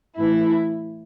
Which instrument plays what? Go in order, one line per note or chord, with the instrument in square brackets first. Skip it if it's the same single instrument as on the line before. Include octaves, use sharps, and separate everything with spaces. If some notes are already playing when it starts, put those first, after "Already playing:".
[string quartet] A2 E3 E4